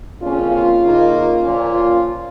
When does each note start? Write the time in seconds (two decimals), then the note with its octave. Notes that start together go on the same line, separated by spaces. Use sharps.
0.21 F2 C#3 A#3 C#4 F4
0.51 F4
0.81 C#3 A#3 D#4
1.11 F4
1.41 A#2 F3 C#4
1.71 F4